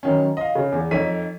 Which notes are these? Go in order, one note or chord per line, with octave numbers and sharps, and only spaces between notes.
F#2 D#3 C#4
D#5 F5
C#3
E2
F2 D#4 A4 C#5 B6 D#7